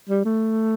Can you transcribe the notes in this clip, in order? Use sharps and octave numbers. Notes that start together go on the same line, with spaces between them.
G3
A3